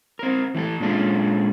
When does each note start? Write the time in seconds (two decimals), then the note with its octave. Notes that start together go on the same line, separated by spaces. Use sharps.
0.19 C4 A#4
0.55 E3 A3 G#4 A4
0.80 A#2 G#3 C#4 D4 F4 A4